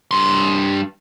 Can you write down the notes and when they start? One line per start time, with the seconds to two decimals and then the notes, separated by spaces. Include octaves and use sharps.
0.11 G2 C6